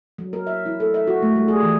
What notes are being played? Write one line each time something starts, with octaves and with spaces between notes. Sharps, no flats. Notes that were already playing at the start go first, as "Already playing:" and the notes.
F#3
A#4
E5
E4
A4
E5
F#4
A3
G3
G#4
E3